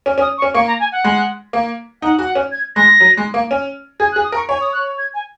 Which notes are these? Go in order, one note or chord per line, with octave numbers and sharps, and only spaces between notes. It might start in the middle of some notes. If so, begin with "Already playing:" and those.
C#4
C#4
D#6
C#6
C#4
A#3 C#6
A#5
G#5
F#5
G#3
A#3
D#4 F#5
F#4
F#5
C#4
G#6
G#3 A#6
F#3
G#3
A#3
C#4
G#4 G#6
F#6
G#4
D#6
A#4
C#6
C#5 G#5
D#6
F#6
G#6
G#5